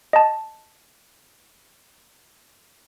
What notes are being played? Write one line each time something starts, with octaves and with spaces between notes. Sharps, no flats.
D#5 A5